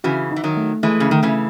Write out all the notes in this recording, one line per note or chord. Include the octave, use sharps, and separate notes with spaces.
C#3 E3 F#4
D#4
E3
D#3 F#3
A3
E3 G#3 A3
C#3
D#3 A3
C#3 E3